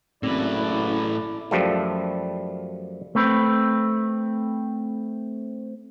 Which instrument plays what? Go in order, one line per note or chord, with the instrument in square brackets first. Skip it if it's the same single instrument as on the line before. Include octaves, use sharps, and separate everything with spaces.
[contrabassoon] F#1 [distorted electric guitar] A2 B4 [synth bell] C4 [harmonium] E4 D5
[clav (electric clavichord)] F#2 F3 G3 A3
[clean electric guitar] A3 C4 B4